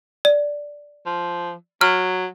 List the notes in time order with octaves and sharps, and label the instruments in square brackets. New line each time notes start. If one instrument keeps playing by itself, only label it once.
[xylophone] D5
[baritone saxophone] F3
[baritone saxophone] F#3 [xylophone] F6